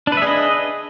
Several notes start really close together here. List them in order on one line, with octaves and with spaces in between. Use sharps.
D4 B4 E5 G#4 D#5